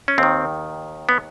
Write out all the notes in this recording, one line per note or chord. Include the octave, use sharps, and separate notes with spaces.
C#4
D#2 D#3 C4
B3